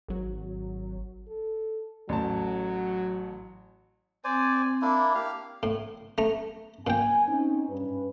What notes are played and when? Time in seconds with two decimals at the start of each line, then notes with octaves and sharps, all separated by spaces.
0.08 G#1 F#3
1.28 A4
2.09 A1 F#3 A5
4.24 C4 C5 D5 G#5
4.82 A#3 D4 E4
5.15 A#3 G4 F5
5.63 A2
6.18 A3 A#5
6.87 A#2 G5 G#5
7.27 C4 C#4 D#4
7.69 G2 C#4 B4